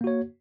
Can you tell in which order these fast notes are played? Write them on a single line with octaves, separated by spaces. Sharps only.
A#3 F#4 C#5